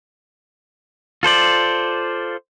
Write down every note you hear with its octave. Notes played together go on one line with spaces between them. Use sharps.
F4 A4 C5 D5